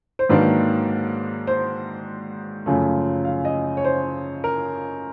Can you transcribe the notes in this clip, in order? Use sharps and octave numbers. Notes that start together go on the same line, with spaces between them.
C5
G#2 D#3 F#3 A#3 D4 B4
C5
F#2 C#3 F3 A3
F5
D#5
C#5
C5
A#4